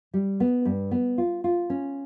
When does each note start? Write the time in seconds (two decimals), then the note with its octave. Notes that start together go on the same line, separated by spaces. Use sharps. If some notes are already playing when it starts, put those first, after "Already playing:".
0.14 G3
0.40 B3
0.65 G2
0.91 B3
1.18 F4
1.44 F4
1.70 C#4